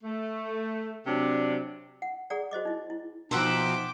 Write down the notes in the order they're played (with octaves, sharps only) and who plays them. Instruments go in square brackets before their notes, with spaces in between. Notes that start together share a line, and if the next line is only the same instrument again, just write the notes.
[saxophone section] A3
C3 F#3 D4
[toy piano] F#5
G#4 A4 D5 F#5 A#5
F#4 C5 D#5 D6
D#4 E4
E4
[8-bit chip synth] B2 F3 [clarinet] D#4 [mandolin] C5 E5 F#5 [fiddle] G5 D6